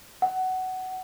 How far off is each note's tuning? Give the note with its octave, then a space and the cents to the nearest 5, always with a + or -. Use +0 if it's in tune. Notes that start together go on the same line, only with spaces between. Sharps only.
F#5 +15